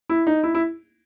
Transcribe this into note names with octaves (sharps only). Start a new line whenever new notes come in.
E4
D#4
E4
E4